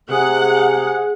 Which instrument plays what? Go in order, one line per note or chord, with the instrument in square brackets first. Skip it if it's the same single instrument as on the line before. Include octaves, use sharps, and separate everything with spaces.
[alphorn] C3 [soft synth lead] G#4 [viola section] F#5